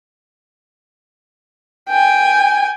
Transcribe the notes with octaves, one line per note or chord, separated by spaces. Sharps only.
G5 G#5